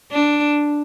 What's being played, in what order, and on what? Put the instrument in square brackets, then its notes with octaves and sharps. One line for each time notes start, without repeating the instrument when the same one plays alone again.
[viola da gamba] D4